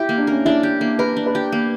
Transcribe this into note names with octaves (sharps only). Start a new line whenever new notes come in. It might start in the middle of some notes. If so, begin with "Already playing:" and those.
Already playing: E4 G4
A#3
D4
C#4 A#4
D4 E4
G4
A#3
A#4 B4
D4
B4
G4
A#3